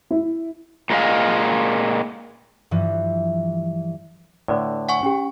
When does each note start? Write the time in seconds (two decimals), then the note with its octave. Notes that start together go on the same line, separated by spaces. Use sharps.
0.11 E4
0.90 A#2 G#3 E4 D#5 F5
2.71 G2 E3 F3
4.48 A2 D3 B4 D5
4.89 F#5 G#5 C#6
5.03 C#4 G4